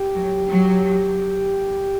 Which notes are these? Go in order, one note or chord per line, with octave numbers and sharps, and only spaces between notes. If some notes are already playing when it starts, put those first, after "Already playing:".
Already playing: G4
F#3
F#3